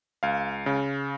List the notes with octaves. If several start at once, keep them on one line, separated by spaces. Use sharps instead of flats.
C#2 F5
C#3